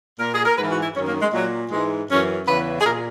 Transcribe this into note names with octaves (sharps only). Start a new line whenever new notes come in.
A#2 A#4
G#4
A#4
G#2 E3 B4
F#4
E4
F#2 D#3 C#4
A#3
G#3
A#2 F#3
G#2 E3 G#3
F#2 E3 C#4
E2 C#3 E3 B4
G#4
A#2 A#4